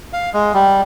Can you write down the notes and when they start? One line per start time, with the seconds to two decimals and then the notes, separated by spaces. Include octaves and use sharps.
0.13 F5
0.33 G#3
0.54 G3